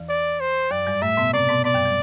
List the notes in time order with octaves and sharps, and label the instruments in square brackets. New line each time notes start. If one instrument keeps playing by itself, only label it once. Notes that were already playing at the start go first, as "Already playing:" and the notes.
Already playing: [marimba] E2 E3
[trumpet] D5
C5
[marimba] F#2 F#3 [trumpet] D5
[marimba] G2 G3
[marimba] A2 A3 [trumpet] E5
[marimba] B2 B3
[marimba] C3 C4 [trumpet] D5
[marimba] B2 B3
[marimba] B2 B3 [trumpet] D5
[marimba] F#2 F#3
G3